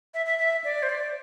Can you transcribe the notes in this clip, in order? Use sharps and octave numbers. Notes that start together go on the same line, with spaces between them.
E5
E5
E5
D5
C5
D5